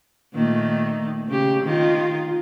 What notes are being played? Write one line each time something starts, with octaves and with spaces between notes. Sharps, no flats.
A#2 D#3 A3
C#3 G4
D#3 F4